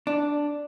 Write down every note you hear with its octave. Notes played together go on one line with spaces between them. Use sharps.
D4